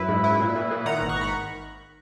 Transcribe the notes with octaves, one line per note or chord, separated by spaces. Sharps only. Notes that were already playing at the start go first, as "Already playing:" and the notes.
Already playing: F#2 E4 B4
G#2
E4
A#2
A#2
A#2
D#3 F#5 A#5
G#1
C#6
B5